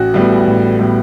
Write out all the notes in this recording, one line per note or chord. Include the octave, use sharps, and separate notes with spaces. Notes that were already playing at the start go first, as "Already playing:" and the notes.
Already playing: A1 F#4
A2 G3 B3
A1
A2 G3 B3